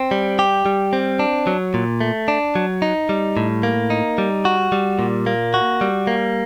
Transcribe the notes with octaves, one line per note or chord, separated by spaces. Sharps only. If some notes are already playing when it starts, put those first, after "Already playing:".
Already playing: C4
G3
G4
G3
C4
D4
F#3
A#2
A3
D4
F#3
D#4
G3
A2
A#3
D#4
G3
F#4
G3
A#2
A#3
F#4
G3
A#3